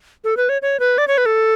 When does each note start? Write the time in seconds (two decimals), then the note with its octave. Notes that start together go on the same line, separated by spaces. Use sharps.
0.24 A4
0.37 B4
0.49 C#5
0.62 C#5
0.80 B4
0.98 D5
1.08 C#5
1.18 B4
1.26 A4